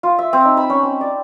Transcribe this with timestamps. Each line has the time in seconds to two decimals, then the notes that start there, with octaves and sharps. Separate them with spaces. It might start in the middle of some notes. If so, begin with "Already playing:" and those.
0.03 F4
0.19 E5
0.33 C4
0.45 D#4
0.57 B5
0.70 C#4
0.83 C4
1.01 D5